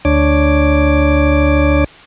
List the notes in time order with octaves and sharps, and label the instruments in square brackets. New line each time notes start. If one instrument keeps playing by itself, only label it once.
[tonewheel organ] D2 D4 C#5 D6